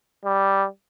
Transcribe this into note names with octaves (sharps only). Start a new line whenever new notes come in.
G3